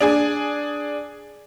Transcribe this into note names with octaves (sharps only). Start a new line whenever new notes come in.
D4 G#4 G#5